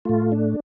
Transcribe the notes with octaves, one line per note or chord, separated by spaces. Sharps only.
A2 A3 F4
D4